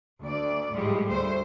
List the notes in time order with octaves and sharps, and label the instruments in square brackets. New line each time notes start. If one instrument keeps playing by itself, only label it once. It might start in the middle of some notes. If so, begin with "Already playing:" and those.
[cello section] D2 D5
A2 F3 G3 G#3
D2 C5